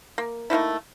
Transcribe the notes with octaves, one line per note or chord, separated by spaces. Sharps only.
A#3
A3 A#3 D#4 E4